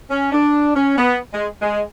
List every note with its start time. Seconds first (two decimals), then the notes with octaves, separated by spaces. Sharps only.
0.10 C#4
0.32 D4
0.75 C#4
0.97 B3
1.34 G#3
1.62 G#3